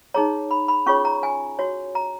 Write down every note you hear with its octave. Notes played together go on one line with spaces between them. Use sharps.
D#4 G#4 C#5 A#5
B5
B5
C#4 F4 G#4 C#5 C#6
A#5
G#5
F#4 C#5
A#5